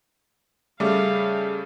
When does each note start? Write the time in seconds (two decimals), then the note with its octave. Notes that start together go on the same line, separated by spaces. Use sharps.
0.80 C#3 G3 A3 G#4 E5 F5 D6